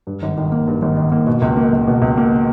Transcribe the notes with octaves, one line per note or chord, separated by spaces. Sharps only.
G2
G#1
D#3
A#3
G2
G#1
D#3
A#3
B2
C#2
A#3
C#2
B2
C#2
A#3